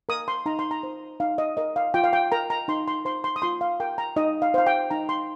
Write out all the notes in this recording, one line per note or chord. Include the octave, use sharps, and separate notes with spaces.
A#4 D#6
C6
D#4 A#5
C6
A#5
C5
D#4 F5
D#5
A#4 D#5
F5
F4 G5
F5
G5
A#4 A#5
A#5
D#4 C6
C6
C5 C6
C6
D#6
F4 C6
F5
A#4 G5
A#5
D#4 D#5
F5
C5 F5
G5
D#4 A#5
C6